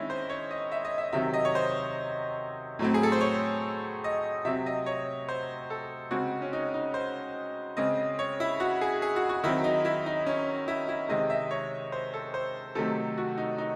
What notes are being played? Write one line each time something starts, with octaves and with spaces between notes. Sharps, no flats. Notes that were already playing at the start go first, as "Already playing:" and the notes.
Already playing: D#3 G#3 C4 C#4 D#4 E4
C5
C#5
D#5
E5
D#5
E5
C3 D#3 F#3 C4 E5
D#5
C#5
C5
A2 F#3 A3 C4
G#4
A4
C5
C#5
D#5
C3 F#3 C4 E5
D#5
C#5
C5
A4
C#3 G#3 C4 F#4
C#4
D#4
D#4
C5
C#3 G#3 C4 D#5
C#5
E4
F#4
G#4
G#4
F#4
F#4
D#3 F#3 C4 E4
D#4
E4
D#4
C#4
E4
E4
C3 D#3 G#3 C4 D#5
E5
C#5
C5
A4
C5
C3 D#3 F#3 A3 C4 A4
F#4
D#4
D#4